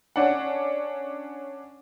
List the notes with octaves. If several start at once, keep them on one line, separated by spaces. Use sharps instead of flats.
C#4 D4 F#5